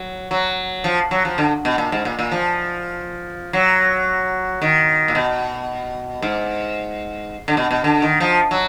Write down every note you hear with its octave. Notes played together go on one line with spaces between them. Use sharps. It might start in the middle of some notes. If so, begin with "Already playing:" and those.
Already playing: F#3
F#3
F3
F#3
F3
D3
B2
A#2
G#2
A#2
A#2
F3
F#3
D#3
A#2
B2
G#2
D3
B2
B2
D3
D#3
F3
F#3